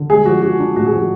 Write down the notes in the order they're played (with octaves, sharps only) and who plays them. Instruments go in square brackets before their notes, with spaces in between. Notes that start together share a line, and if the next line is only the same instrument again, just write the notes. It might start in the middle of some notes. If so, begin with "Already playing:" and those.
Already playing: [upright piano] D3
G#3 G#4
F3 F#4
D4 F#4
D4
A2 F#4
G#4
F3 F#4